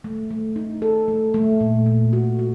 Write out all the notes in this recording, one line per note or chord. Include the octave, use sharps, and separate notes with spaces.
A3
A3
D#4
A4
A3
A3
A#2
A#2
F#4
F#4